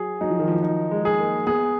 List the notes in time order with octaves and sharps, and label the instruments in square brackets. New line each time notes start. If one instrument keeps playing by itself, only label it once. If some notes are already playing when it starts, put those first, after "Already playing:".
Already playing: [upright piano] F#3 [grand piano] G#4
[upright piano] F#3 [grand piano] D#4
[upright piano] F3
D#3
F3
[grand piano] D#4
[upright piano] G#3
[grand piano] G#4
[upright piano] A#3
[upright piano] B3 [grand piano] G#4